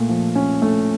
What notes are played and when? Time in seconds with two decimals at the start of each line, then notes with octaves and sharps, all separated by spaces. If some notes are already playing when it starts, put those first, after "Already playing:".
Already playing: A#2 A3
0.09 F3
0.35 C#4
0.62 A3